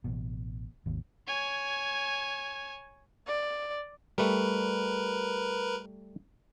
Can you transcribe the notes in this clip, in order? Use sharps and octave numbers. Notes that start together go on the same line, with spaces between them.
A1 B2
G#1 D#2
C#5 G#5
D5
G3 A3 A#4 B4